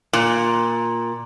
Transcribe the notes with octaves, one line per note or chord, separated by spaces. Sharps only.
A#2